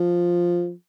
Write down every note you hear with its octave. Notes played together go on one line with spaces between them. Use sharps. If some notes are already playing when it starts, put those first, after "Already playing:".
Already playing: F3